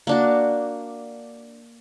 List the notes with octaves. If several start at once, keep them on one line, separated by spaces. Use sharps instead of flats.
A#3 D4 F#4